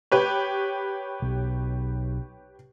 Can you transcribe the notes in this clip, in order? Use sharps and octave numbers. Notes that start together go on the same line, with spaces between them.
G4 B4 C#5
B1